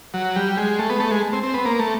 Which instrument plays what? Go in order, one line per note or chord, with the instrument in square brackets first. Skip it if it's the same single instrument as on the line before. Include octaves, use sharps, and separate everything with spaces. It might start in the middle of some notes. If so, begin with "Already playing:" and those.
[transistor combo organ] F#3
G3
G#3
A3
B3
A3
G#3
C4
C4
B3
A#3
A3